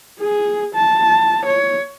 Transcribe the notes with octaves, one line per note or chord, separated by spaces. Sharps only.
G#4
A5
C#5